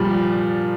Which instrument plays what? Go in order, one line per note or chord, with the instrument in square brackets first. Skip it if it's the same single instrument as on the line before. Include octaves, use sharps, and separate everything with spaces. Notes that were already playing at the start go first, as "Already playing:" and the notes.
Already playing: [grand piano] A#2 F3 G3